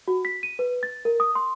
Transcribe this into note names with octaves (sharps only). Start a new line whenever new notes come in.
F#4
B6
D#7
B4
A6
A#4
D#6
C6